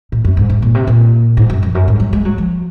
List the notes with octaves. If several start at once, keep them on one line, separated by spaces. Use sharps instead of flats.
A#2
F#2
G#2
G#2
A#2
C3
A#2
G#2
F#2
F2
F#2
G#2
F#3
G#3
F#3
F3